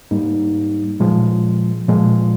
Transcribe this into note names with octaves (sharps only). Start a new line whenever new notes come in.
G#2 G3 A#3 D#4
A#2 F3 G#3
A#2 F3 G#3